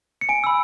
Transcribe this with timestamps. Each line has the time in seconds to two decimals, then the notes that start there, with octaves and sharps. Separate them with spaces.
0.21 C#7
0.29 G#5 D7
0.44 B5 E6